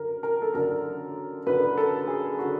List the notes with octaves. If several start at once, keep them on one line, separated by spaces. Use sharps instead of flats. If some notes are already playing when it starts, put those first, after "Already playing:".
Already playing: F#2 D3 A#4
A#4
A4
F#2 D3 A#4
F#2 D3 B4
A4
G#4
D3 F#4